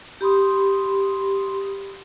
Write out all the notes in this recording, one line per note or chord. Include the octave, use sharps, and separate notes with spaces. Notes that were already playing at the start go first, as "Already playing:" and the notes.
G4 B5 C6 D#6